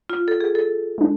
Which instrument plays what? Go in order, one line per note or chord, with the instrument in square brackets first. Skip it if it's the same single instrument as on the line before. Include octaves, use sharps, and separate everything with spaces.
[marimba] F4
A4
G#4
A4
[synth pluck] G#3 D4